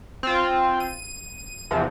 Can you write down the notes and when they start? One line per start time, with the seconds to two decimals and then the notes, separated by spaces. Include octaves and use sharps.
0.23 C4 F4
0.80 D#7
1.71 E2 C3 F3